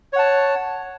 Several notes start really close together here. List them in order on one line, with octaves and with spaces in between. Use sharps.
C#5 F#5 A5